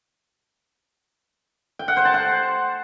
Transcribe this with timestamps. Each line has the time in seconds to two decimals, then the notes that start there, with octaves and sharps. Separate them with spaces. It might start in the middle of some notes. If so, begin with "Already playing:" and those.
1.79 G5
1.88 F#5
1.97 C5
2.05 A5
2.14 F#5